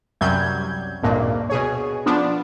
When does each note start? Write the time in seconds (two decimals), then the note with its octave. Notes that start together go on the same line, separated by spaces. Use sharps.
0.21 C2 F#2 F#3 G3 G6 G#6
1.03 G#1 D2 G2 A#2 A#3
1.50 B2 G#4 C#5
2.06 F3 B3 D4